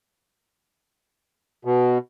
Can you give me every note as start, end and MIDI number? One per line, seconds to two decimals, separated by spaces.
1.65 1.98 47